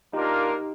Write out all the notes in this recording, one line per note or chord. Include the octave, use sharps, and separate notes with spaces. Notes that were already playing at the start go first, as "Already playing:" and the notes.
A#3 D4 D#4 F4 G4 A#4 F5